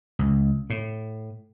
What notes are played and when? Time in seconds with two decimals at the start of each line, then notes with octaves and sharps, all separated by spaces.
0.19 C#2
0.70 A2